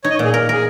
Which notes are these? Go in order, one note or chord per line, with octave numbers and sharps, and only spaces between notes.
D#4 C#5
D#5
C#5
A#2
G#4
A#4
G#4 A#4